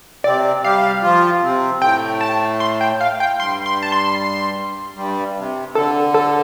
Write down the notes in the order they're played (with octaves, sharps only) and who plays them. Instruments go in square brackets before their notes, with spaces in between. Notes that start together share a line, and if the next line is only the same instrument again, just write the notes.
[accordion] C3 C4 [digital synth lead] D5
[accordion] G3 G4 [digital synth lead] F5
[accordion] F3 F4
C3 C4
[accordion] A2 A3 [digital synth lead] G5
[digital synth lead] A5
C6
G5
F5
G5
[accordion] G2 G3 [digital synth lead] C6
[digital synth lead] C6
A5
C6
[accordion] G2 G3
C3
[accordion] D3 [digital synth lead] A4
[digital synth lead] A4